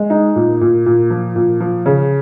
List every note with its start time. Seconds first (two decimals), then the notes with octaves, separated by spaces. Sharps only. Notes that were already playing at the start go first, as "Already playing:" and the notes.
Already playing: G#3
0.10 D#4
0.36 A#2
0.61 A#2
0.86 A#2
1.10 F3
1.36 A#2
1.60 F3
1.86 C#3